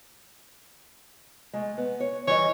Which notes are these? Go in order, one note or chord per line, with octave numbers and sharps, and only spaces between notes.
G#3 A3
B3
C#5
E3 G3 C#5 D#5